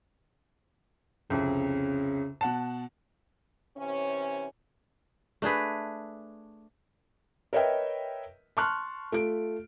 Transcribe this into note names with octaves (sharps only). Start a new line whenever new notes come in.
C2 F2 C#3
B2 F#5 A5
C3 E3 C#4
A3 D4 G#4 B4
A#4 B4 C#5 D#5 E5 G5
A5 C6 C#6 F6 F#6
A3 F4 D7